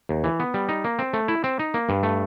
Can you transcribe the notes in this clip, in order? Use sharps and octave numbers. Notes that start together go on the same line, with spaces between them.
D#2
E3
B3
G3
D#4
A#3
C4
A3
E4
C4
D#4
A#3
G2
A3